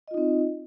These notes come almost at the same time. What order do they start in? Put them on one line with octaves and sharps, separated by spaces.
D#5 F4 D#4 C4